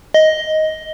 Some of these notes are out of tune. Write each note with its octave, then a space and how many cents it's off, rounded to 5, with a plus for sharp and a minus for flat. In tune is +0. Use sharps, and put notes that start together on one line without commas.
D#5 +10